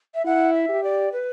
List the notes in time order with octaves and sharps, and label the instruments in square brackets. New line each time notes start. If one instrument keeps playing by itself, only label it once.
[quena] E5
[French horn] E4 [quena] F#5
[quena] E5
[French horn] G4
[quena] D5
B4